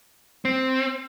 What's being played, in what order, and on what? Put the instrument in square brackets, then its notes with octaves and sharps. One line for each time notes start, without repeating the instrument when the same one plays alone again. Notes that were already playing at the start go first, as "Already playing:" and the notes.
[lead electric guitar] C4